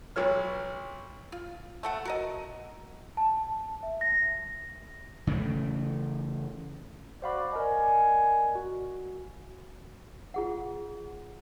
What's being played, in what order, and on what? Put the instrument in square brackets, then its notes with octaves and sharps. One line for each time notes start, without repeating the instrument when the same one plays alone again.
[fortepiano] B1 F#3 C#5 F6
[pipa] F4
A3 A4 F#5
F#4 A#4 D#5
[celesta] A5
E5
A#6
[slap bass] C#3 E3 A3
[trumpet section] F#4 D5 [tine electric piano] C5 F5 B5
[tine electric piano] A#4 D5 D#5 [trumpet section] G#5
[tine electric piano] F#4
[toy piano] F4 G#4 F#5